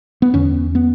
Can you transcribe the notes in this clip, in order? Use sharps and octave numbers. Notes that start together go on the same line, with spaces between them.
B3
E2 D3 C#4
B3